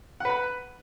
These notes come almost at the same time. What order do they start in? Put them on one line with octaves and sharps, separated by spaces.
F#5 B4 B5